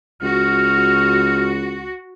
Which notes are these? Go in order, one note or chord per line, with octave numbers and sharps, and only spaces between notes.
C#2 F#4 F6